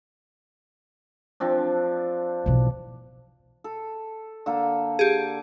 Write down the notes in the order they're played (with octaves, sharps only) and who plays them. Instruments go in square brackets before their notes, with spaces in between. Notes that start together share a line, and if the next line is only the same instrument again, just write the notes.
[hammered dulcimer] F3 C4 D4
[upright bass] B1 E3
[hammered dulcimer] A4
D3 A#3 A4
[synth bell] G4 G#4